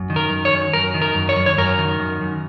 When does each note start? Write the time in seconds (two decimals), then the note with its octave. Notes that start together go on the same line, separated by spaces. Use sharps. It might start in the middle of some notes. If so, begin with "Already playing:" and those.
Already playing: F#2
0.10 D#3
0.16 A#4
0.30 F#2
0.45 C#5
0.52 F#2
0.73 F#2 A#4
0.94 D#3
1.02 A#4
1.15 F#2
1.29 C#5
1.36 F#2
1.46 C#5
1.58 F#2 A#4
1.78 D#3
2.00 F#2
2.21 F#2